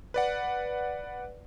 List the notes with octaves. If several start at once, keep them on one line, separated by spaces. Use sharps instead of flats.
B4 D5 F#5